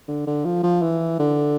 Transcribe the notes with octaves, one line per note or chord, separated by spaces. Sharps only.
D3
D3
F3
F3
E3
D3